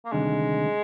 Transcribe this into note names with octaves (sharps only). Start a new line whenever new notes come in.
A#3
D2 C3 D#3 G3 G#3 D4